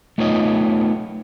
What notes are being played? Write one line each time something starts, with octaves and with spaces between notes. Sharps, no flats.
A3 B3 D#4 F4 C#5 D#5